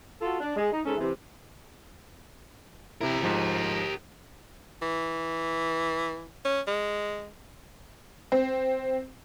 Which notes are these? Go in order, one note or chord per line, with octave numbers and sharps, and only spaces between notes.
F4 F#4 A4
D4
G#3
D#4
G#2 G#3 C#4 A4
C3 E3
C3 E4 G4 A#4
G#2 F3
E3
C#4
G#3
C4